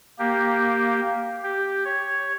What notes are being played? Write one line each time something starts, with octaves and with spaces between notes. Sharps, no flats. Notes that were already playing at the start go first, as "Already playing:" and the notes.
A#3 G4
G4
C#5